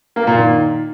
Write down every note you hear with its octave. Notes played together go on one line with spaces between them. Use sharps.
A#3
A#2
D#3